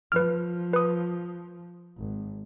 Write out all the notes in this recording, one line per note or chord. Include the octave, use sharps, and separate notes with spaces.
F3 B4 F6
B4 D#6
G#1